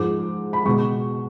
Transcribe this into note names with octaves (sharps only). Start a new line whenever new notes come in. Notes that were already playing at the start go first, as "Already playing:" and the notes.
Already playing: G#2 F3 G#3 D6
B5
B2 G#3 C#6